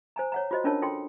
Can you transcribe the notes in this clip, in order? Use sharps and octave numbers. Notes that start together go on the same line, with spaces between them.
C5 G#5 A#5
C#5 F#5 A#5
F4 F#4 C5 D#5
C#4 D4 F4 A#4 C#5 A5
F4 A4 G5 C6